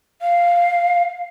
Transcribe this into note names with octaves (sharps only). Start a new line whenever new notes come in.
F5